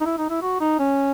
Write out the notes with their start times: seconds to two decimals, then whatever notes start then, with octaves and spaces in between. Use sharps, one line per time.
0.01 D#4
0.06 E4
0.18 D#4
0.30 E4
0.42 F#4
0.61 D#4
0.79 C#4